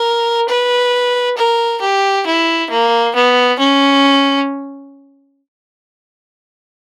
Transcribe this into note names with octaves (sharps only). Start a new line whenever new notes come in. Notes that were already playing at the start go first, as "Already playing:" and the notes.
Already playing: A#4
B4
A#4
G4
E4
A#3
B3
C#4